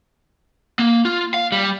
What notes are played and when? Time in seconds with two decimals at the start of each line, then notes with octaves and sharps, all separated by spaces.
0.79 A#3
1.05 F4
1.34 F5
1.52 G3